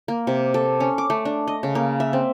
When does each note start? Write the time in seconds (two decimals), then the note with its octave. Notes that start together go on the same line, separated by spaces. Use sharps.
0.08 A#3
0.27 C3
0.54 A4
0.80 C#4
0.98 D6
1.10 A3
1.25 D4
1.47 D#5
1.63 C#3
1.75 A#3
2.00 E5
2.13 C4